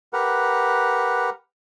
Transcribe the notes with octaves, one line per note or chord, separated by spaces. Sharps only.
G4 A#4 B4 F#5